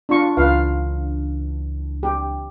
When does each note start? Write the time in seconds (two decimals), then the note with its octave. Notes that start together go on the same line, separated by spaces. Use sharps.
0.09 D4 F4 C#6
0.37 C#2 E3 D4 F4 B4 F5
2.03 G4